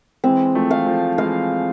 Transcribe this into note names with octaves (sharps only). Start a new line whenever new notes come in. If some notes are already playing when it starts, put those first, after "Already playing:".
E3 G#3 C4
F3 A3
F5
F3 A3
E3 G#3 F5